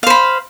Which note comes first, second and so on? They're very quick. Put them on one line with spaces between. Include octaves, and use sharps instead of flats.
F5 C5 B5